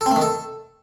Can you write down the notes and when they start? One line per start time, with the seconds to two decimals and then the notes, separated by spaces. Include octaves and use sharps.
0.01 A4
0.06 C4
0.11 A3
0.16 D#3
0.21 A4